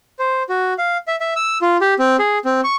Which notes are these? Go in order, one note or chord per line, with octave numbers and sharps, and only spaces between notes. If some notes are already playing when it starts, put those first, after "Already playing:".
C5
F#4
F5
E5
E5
E6
F4
G4
C4
G#4
C4
C#6